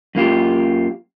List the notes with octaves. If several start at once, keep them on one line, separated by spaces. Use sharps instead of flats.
F#2 A#3 F4 G4